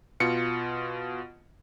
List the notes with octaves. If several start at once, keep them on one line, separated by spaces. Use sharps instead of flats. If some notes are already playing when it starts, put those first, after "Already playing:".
B2 F4 C#7